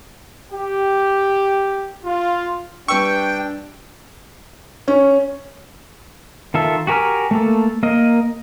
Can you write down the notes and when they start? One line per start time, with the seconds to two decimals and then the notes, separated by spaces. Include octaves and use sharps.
0.52 G4
2.05 F4
2.88 G3 D4 B4 G5 C#6 E6
4.88 C#4
6.54 D#3 F4 A4 E5
6.87 F#4 G4 A#4 G#5 F6
7.31 A3 A#3 A4
7.83 A#3 A#4 D#5